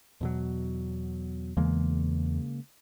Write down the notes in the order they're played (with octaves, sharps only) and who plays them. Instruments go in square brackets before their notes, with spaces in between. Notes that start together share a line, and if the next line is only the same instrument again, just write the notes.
[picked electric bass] E2 B2 F#3
[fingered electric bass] E2 E3 [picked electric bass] C#3 G#3 A#3